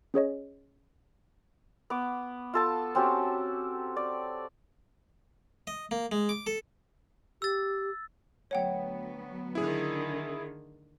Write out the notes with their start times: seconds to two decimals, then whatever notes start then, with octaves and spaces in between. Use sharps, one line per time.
0.14 C#4 G#4 C#5 D#5
1.90 B3 D6
2.54 F4 A4 A5
2.95 C4 C#4 F#4 G4
3.96 D5
5.67 D#5
5.91 A#3
6.12 G#3
6.29 D6
6.47 A4
7.42 G4 E6 A6
8.51 D2 F#3 B3 C#5 F#5 G5
9.55 D3 D#3 E4 G#4